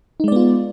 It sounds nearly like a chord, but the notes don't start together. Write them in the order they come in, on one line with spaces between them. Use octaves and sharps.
D#4 G#3 D5 B3 F4